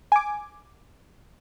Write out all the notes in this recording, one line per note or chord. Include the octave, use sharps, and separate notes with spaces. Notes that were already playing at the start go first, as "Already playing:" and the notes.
G#5 D6